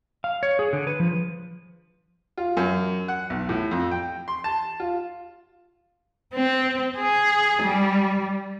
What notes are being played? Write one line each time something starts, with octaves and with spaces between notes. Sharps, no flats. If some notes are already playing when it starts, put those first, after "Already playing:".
F5
C#5
G#4
D3
B4
F3
F4
F#2
F#5
B1
A2
F2
G5
C6
A5
F4
C4
G#4
G3